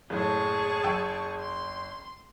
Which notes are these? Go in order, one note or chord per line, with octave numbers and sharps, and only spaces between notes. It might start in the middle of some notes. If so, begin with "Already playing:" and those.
F#1 A2 G#4 A5 C#6
F#1 G5 E6
C6